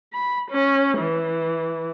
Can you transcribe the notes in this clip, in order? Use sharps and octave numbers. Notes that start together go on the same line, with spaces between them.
B5
C#4
E3